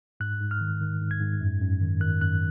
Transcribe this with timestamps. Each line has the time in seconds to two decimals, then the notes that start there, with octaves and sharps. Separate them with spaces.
0.20 G#2 F#6
0.40 G#2
0.51 F6
0.61 D#3
0.81 D#3
1.01 G#2
1.11 G#6
1.21 G#2
1.41 F#2
1.61 F#2
1.81 D#3
2.01 D#3 F#6
2.21 F#2 F#6